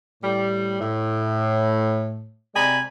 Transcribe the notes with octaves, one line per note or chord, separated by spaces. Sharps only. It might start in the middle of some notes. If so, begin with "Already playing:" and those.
A2 G3
A2
C3 G#3 D5 G#5 A#5 B5